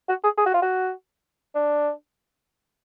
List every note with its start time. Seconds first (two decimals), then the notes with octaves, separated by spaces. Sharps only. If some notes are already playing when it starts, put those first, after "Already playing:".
0.09 F#4
0.24 G#4
0.38 G#4
0.46 F#4
0.54 F4
0.62 F#4
1.55 D4